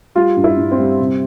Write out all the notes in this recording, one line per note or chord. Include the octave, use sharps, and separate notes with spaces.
G3 F4
G2
E4
G2
C4
G3
C3